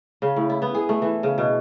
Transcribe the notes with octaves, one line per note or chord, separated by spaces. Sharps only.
C#3
A2
E4
B3
G#4
A3
E3
C#3
B2